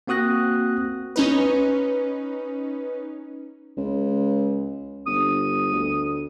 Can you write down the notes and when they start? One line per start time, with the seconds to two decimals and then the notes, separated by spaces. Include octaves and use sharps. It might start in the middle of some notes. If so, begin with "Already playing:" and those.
0.07 A#3 C4 F#4 D#6 F#6 A#6
1.16 C#4 D#4 B4
3.77 C#2
5.07 G1 D#6
5.72 D2